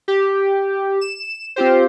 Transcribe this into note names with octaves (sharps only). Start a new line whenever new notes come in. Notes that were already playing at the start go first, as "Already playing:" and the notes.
G4
E7
C4 F4 G4 C5